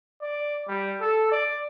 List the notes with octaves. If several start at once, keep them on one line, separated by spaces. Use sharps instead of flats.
D5
G3
A4
D5